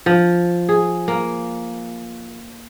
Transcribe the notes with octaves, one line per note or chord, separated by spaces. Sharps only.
F3
G#4
A#3